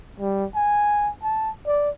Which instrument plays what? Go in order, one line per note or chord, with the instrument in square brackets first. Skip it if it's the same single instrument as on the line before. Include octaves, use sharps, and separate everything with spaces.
[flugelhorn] G3
G#5
A5
D5